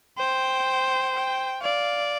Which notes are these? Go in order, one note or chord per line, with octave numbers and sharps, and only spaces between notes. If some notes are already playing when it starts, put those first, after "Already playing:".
C5 G5
G5
D5 F5